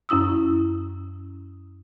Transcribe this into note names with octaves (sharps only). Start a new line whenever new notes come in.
F#2 C#4 E4 D#6 E6